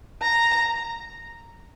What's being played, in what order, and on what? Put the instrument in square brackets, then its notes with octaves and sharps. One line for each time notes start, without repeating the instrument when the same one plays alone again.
[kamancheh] A#5